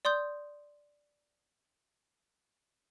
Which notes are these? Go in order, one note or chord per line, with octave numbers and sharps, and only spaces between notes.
D5 C6 D#6 G6